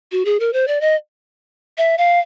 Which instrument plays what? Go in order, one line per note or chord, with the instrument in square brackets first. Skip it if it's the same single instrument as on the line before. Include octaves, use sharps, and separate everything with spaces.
[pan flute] F#4
G#4
A#4
C5
D5
D#5
E5
F5